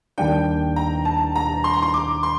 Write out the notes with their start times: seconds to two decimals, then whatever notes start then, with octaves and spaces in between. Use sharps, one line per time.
0.18 D#2 D#3 G3 D4 G5
0.76 A#5
1.05 A5
1.36 A#5
1.64 C6
1.73 A#5
1.82 C6
1.94 D6
2.23 C6